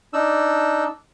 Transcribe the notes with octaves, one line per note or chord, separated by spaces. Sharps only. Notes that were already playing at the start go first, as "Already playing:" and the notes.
D4 D#4 E6